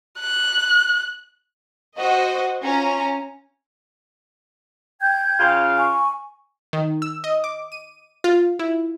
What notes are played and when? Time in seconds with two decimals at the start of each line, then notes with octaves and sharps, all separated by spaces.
0.19 F#6
1.99 F#4 C5 D#5
2.63 C#4 F4 A#5
5.01 G5 G6 G#6
5.39 C#3 F4 F5
5.76 G#5 C#6
6.73 D#3
7.02 E6
7.24 D#5
7.44 D6
7.72 D#7
8.24 F4
8.59 E4